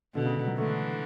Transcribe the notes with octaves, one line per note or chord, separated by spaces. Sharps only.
B2 D3
C#3
D3
F#3
D3 E3 A3